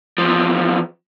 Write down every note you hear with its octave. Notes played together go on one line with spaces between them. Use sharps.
E2 F3